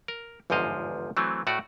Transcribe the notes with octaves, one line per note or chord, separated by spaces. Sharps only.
A#4
G1 E2 G#2 F3 D#5 F5
E3 F#3 A3 C4
A2 A3 F#4 D5